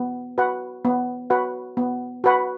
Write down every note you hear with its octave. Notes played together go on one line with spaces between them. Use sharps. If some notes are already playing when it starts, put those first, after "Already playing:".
Already playing: B3
F#4 B4 F#5
B3
F#4 B4 F#5
B3
F#4 B4 F#5